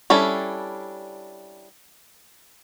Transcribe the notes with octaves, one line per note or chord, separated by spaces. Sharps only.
G3 C#4 D4 E4 A4